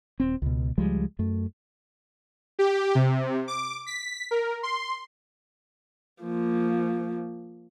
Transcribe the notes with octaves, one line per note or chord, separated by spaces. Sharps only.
D#1 C4
C#2 B2
C#2 F3 G3 G#3
F#2 A3
G4
C3
D6
B6
A#4
C6
F3 A#3